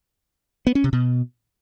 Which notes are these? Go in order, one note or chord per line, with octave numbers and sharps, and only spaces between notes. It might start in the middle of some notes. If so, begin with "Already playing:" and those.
B3
C#4
C3
B2